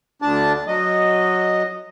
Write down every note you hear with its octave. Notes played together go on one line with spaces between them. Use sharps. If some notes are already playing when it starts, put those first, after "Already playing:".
D2 D4 A5
F#3 D#5